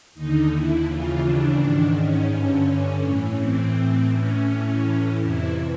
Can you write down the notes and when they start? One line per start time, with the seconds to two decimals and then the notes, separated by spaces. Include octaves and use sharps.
0.15 D#2 D3 D#4
0.50 E4
0.86 D#2 C#3 E3 F4
1.23 D4
1.58 G#2 D#3
1.95 C#4
2.30 G2 D3 C#4
3.03 A2 E3
3.39 C4
3.75 A2 E3
4.11 C#4
4.48 A2 E3
5.19 F2 C3 E3 E4